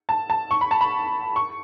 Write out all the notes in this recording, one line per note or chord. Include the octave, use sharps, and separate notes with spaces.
A5
A5
C#6
B5
A5
B5
C#6